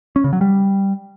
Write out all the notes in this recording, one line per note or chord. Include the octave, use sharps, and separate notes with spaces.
C#4
C#3
F#3
G3